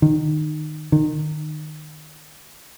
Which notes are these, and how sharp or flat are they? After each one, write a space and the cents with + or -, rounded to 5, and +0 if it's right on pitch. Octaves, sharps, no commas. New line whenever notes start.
D#3 -20
D#3 -25